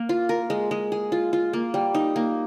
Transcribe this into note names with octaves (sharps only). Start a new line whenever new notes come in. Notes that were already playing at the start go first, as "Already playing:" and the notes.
Already playing: A#3
F4
A#4
G#3
G#3
G#4
F4
F4
A#3
G3
D#4
A#3